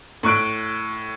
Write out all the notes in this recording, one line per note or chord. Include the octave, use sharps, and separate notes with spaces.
A2 C#6 F#6 D7